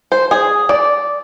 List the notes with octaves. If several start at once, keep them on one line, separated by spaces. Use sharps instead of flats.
C5
G#4
D5